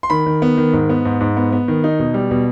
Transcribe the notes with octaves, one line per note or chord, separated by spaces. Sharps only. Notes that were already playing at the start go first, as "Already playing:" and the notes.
C6
D#3 B5
D#3
B3
D#3
G#2
B3
G#2
G#2
B3
B3
D#3
D#4
B2
G3
B2